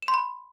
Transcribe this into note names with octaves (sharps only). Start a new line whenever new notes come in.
E7
C6
B5